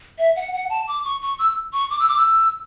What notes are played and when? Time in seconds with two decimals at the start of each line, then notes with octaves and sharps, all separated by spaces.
0.18 E5
0.36 F#5
0.53 F#5
0.70 A5
0.88 D6
1.04 C#6
1.22 C#6
1.39 E6
1.73 C#6
1.90 D6
2.00 E6
2.08 D6
2.17 E6